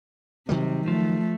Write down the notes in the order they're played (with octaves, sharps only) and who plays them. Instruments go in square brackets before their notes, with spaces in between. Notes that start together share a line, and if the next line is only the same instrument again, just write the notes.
[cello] C3 [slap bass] D#3 F#3 G3
[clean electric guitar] F3 [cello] A3